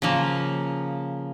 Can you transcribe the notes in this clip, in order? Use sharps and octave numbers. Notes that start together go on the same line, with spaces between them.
C#3 F3 A#3